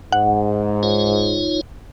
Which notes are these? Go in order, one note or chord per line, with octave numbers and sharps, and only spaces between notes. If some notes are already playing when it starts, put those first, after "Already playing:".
G#2 F#5
D#4 F4 C#5